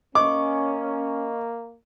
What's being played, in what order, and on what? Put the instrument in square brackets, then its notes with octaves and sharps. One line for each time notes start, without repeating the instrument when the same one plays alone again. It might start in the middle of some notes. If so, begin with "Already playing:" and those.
[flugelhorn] A#3 [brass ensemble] C#4 [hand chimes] D#5 C#6 [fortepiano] D6